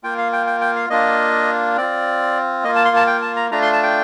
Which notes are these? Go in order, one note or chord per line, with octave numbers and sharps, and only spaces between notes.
A#3 F4 G5
F5
G5
G5
G5
F5
A#3 D4 F4 D#5
C4 F4 D5
A#3 F4 D#5
A5
C6
A5
G5
A5
A#5
A3 D4 F4 A#5
C6
A5
G5